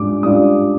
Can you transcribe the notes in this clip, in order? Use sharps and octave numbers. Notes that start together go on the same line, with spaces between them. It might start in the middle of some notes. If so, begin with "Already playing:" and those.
Already playing: G#2 G3 D4 F4 D6
G#2 G3 D4 F4 D#6